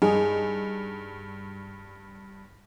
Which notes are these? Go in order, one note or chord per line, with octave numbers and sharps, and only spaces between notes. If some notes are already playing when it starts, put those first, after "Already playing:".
G2 D#4 G#4